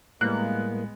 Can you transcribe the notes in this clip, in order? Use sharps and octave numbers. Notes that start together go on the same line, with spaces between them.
A2 G3 G#3 A#3 B3 B4 F#6